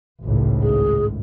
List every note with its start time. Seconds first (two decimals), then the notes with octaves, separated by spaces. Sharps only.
0.23 G#1 C#2 A2
0.62 G#4